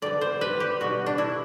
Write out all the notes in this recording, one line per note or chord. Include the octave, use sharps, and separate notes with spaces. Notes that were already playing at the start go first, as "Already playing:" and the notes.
D3 G3 B3 D5
C5
B4
G4
B2 G3 B3 F#4
D4
E4